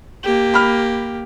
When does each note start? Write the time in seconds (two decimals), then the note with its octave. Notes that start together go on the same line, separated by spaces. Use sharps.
0.24 A#3 G4
0.54 B5 F6